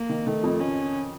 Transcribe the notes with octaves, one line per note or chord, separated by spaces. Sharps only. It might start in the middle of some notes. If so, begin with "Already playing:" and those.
Already playing: A#3
D#3
D#3 A3
F2 F3
C#4